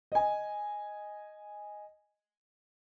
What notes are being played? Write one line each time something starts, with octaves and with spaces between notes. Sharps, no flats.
D#5 G#5